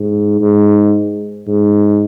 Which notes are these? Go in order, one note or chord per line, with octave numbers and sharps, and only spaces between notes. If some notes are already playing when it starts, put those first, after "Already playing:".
Already playing: G#2
G#2
G#2